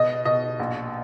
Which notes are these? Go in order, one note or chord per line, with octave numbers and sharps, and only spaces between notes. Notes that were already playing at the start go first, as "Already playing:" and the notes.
Already playing: B2 D#5
B2 D#5
A#1